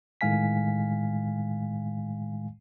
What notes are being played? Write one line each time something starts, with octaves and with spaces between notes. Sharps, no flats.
A2 D#3 G#3 F5 G#5 B6